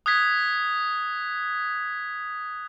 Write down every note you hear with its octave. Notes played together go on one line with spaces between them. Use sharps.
D#6 F#6 G#6 B6